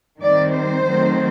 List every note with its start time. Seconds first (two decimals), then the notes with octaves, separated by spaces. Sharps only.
0.21 D#3 G3 C4 D5
0.54 C5
0.88 D#3 F#3 A3 C4